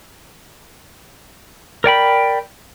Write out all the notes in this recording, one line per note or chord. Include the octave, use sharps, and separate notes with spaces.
A#4 D5 G5 B5